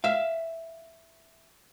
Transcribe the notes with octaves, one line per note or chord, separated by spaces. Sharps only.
E5 F5